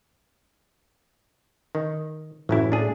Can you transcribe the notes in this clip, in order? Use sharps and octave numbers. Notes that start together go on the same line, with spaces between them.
D#3
A1 F#2 A2 E4
D4 G#4